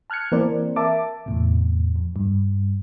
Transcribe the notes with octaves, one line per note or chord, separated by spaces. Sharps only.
A5 F6 F#6 G#6 C#7
E3 A#3 C4 A#4 C5 D5
A#4 E5 A5 D6
E2 A2 C3
F2
G2